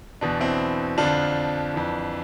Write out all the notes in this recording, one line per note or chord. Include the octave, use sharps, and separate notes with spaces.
E2 B2 D4
C4 E4
F2 D3 F3 D4 F4
F2 E3